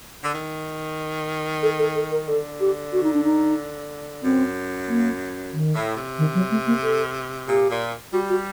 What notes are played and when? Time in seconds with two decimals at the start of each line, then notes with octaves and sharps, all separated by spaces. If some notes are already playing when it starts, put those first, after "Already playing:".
0.23 D3
0.33 D#3
1.63 A4
1.79 A4
1.95 A4
2.12 A#4
2.28 D3 A4
2.60 G4
2.93 F#4
3.03 D#4
3.14 D4
3.24 D#4
4.23 F#2 C4
4.88 A#3
5.53 D#3
5.75 A2
5.97 C3
6.18 D#3
6.35 F#3
6.51 A3
6.67 A#3
6.83 A4
7.48 A#2 G4
7.70 A#2
8.13 G3 F#4
8.30 F#4